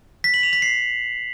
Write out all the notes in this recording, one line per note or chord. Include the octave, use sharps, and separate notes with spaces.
B6
F#7
F7
B6
C7